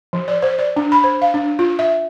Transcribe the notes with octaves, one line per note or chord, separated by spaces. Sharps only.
F3
D5
C5
D5
D4
B5
C5
F5
D4
F4
E5